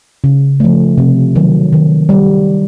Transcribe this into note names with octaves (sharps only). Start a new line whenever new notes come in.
C#3
F3 A3
C3
D#3 F#3
D#3
G3